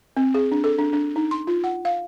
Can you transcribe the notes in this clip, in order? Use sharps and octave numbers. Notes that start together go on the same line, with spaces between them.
C4
G#4
D4
A4
D4
D4
D#4
C6
F4
F#5
F5